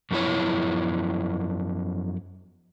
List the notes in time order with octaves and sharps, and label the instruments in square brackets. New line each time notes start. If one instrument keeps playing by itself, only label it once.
[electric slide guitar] F#2 F3 B3 E4 C#5